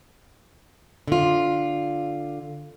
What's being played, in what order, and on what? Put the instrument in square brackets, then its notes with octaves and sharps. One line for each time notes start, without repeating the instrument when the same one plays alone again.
[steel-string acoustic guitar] D3 F4